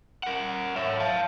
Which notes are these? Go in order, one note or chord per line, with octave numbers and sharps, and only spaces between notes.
A#4 F#5
C#5 E5
F5 A5